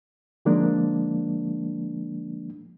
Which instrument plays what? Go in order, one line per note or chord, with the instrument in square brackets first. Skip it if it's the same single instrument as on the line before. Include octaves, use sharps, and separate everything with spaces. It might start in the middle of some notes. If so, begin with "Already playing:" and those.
[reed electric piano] D3 F3 G#3 A#3 D4